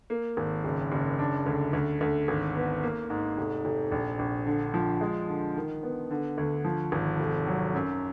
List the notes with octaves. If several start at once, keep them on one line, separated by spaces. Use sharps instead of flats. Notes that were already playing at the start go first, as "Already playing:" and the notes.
A#3
G#1
F#1
F#1
D4
D2
D2
D2
G#1
B3
A#3
G#2
F1
F1
A#1
A#1
D3
F3
G#3
D3
D#3
B3
D3
D2
F3
G#1
F1
F#3
F#2